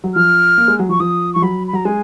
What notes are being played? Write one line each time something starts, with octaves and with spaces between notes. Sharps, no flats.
F#3
F3 F6
A#3
G#3
F#3
F3 C#6
F3 D#6
F3 C#6
F#3 B5
B5
F#3 A#5
G#3 G#5